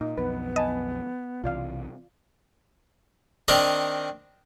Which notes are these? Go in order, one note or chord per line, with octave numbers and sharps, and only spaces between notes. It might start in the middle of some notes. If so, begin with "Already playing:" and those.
A#2 D#4
B1 F2 B3 B4
D#5 G#5 A5 B5
B1 C3 E3 F4 D5 F5
D#3 C4 D4 D#4 A#4 D#5